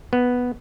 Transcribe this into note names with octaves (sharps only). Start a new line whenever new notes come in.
B3